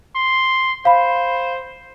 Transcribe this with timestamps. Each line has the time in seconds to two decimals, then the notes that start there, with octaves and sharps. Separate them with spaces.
0.16 C6
0.85 C5 F5 B5